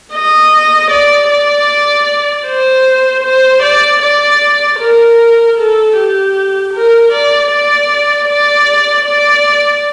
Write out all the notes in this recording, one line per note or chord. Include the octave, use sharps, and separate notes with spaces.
D#5
D5
D5
C5
C5
D5
D5
A#4
A4
G4
A#4
D5
D5
D5
D5